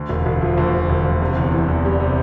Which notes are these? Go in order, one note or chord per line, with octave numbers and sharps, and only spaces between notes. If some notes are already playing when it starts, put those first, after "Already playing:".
Already playing: D2
E1
E1
F3
D2
E1
E1
D2
C3
E2
E3
E2
G3
C3